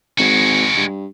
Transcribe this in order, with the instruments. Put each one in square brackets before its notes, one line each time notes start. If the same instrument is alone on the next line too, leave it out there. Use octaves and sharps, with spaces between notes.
[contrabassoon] G#1 [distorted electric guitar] G#3 F#4
[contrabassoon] G2